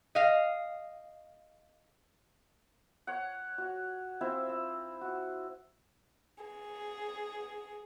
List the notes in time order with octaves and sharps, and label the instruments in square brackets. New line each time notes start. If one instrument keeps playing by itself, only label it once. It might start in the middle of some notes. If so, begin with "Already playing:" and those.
[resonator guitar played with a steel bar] D#5 F5
[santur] C#5 F#5
F#4
C4 E4 F4 E5
E5
F#4
[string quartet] G#4